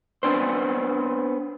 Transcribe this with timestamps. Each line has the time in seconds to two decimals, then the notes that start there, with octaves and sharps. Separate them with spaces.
0.23 B3 C4 D4 C5